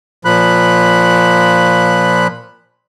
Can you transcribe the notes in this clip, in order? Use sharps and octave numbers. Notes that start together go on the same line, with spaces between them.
A#2 F3 B5 F#6